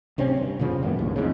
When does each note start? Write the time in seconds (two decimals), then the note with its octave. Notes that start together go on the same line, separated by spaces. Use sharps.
0.18 D1 C3 C4 C#4
0.37 G2
0.59 F1 A#2 C#3 F3
0.83 G#1 F#2 A#3 B3
0.97 A#1 D#2 A2
1.16 A1 F2 G#2 C#3